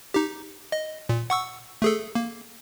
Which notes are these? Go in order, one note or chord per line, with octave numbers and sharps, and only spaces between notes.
D#4 G4
D#5
A#2
F#5 C#6 E6
A3 G#4 A4
A#3